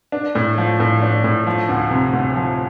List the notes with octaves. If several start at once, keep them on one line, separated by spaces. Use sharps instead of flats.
D4
A2
F3
A2
D4
A2
F3
D2
C3
D2
F3